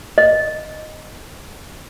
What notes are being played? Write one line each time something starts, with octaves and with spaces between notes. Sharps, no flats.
D#5